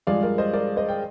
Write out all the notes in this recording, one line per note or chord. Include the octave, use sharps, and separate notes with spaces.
G2 F3 G#3 D5 F5
A#4 D5
C5 D#5
A#4 D5
C5 D#5
G5